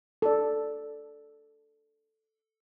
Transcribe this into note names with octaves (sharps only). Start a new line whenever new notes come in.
A4 D5